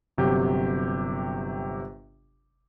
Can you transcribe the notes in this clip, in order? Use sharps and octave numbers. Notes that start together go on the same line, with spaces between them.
G1 C3 F#3 G4